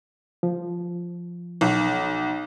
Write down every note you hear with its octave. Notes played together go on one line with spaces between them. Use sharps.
F3
B1